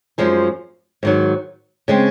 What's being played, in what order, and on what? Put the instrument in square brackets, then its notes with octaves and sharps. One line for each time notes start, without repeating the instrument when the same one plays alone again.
[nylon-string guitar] F#2 F3 G#3 D#4
G#2 D#3 F#3
C#3 G#3 C4